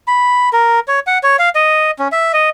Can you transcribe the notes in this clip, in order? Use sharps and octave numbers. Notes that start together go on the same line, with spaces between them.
B5
A#4
C#5
F#5
C#5
F5
D#5
C#4
E5
D#5